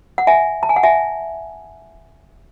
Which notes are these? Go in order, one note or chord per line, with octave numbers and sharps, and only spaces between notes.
F#5
E5 G#5
A5
G#5
F#5
E5 G#5